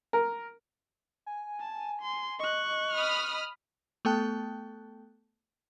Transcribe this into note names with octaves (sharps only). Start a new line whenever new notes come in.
A#4
G#5
A5
C6
D#5 C#6 F#6
B5 D#6 F6
A3 B3 A4 G5 A5 F#6